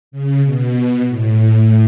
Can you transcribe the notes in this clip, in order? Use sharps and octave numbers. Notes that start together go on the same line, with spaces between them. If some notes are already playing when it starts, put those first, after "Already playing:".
C#3
B2
A2